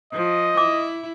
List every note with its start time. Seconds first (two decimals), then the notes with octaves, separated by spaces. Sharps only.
0.13 F3 D#5
0.57 E4 D6